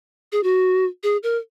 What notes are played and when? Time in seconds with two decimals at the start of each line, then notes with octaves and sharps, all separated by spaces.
0.32 G#4
0.43 F#4
1.03 G#4
1.23 A#4